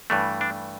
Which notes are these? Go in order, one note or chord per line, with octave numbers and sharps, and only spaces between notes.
G2 E3 A3
D4